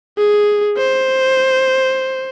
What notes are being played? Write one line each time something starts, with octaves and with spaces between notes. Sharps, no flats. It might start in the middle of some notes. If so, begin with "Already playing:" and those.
G#4
C5